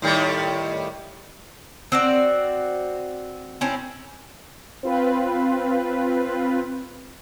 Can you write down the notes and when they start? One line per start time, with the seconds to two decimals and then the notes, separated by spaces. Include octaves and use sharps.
0.02 A2 D#3 G3
1.92 C4 F#4 D5
3.61 C4 C#4 E4
4.83 C4 F4 B4